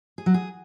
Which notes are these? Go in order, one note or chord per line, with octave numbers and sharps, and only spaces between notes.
G#4
F#3
G#4